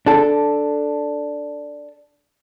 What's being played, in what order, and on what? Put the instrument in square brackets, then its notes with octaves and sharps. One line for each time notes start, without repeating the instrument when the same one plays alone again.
[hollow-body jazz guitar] D4 A4